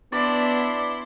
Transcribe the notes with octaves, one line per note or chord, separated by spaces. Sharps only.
B3 D4 E4 D5 C6